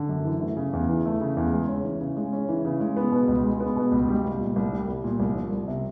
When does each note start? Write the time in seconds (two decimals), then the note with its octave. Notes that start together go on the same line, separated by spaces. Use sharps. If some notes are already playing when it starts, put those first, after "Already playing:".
Already playing: D3
0.09 F#2
0.25 E3
0.41 A3
0.57 C#3
0.73 E2
0.89 E3
1.06 A3
1.21 C#3
1.37 E2
1.53 G#3
1.68 C#4
1.84 E3
2.01 C#3
2.17 G#3
2.32 C#4
2.49 E3
2.65 C#3
2.80 G#3
2.97 B3
3.12 B2
3.28 C#2
3.44 G#3
3.60 B3
3.76 B2
3.92 C#2
4.08 G3
4.24 C2
4.40 A#2
4.56 C2
4.72 G3
4.88 C2
5.04 A#2
5.20 C2
5.35 F3
5.52 C2
5.68 C3